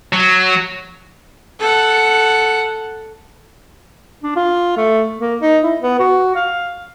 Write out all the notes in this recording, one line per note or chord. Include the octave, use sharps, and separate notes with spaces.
F#3
A4 F#5
D4
F4
A3
A#3
D#4
E4
B3
F#4
F5